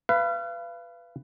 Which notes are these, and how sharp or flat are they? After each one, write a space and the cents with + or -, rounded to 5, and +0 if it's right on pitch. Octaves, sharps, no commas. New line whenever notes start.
B4 +5 F5 -35